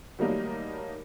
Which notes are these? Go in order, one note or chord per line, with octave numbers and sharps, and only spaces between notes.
D#3 F#3 G3 A3 A#3 D#4